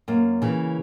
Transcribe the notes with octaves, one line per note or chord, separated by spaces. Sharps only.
F#2 A#3
C#3 E3